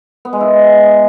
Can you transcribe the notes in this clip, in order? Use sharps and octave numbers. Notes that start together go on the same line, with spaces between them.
B3
G#3
E4